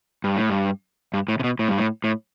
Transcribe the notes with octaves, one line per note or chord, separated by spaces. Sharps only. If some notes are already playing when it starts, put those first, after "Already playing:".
G2
A2
G2
G2
A2
C3
B2
A2
G2
A2
A2